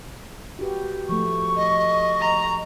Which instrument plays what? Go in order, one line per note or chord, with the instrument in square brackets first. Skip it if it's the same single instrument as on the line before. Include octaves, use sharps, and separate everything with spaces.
[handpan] F#4 G4 B4
[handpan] F3 A3 [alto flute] C#6
[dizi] D#5
[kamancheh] A#5